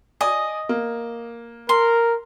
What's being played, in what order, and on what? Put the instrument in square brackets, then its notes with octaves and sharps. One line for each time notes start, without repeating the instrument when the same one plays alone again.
[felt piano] D5 G#5 D#6 [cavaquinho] D#5
[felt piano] A#3
[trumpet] A#4 [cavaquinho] C6